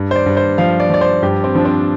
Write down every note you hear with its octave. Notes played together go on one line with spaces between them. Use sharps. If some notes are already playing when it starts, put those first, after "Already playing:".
Already playing: G2
C5
D5
G2
C5
F3 F5
D5
F3 D5
C5
G2 G4
C4
F3 D4
C4